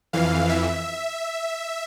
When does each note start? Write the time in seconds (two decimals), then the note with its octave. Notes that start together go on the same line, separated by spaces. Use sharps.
0.13 F2 E3 F5
0.49 E5